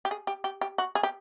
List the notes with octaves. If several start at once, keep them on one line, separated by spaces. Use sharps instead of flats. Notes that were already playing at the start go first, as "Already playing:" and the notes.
G4
G#4
G4
G4
G4
F#4
G#4
G4